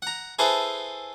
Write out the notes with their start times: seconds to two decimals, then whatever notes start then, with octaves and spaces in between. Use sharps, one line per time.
0.02 F#5 A#5
0.39 E4 G#4 A4 B4 C5 E5